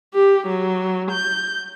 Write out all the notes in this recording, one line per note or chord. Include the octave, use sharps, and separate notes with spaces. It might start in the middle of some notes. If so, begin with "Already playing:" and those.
G4
F#3
G6